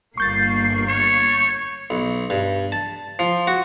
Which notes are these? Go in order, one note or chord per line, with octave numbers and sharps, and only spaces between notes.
G1 A#3 C#6 G6 A6 C7
C#5
B1
G2
A5
F3
F#4